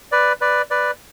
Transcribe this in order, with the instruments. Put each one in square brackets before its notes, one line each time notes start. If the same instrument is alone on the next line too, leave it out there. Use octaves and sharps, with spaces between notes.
[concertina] B4 D5
B4 D5
B4 D5